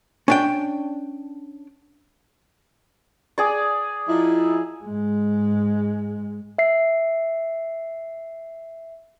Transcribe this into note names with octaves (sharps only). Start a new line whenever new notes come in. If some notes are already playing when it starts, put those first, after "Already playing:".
C#4 D4 G5
G#4 D5
F3 D#4 E4
G#2 G#3
E5 C7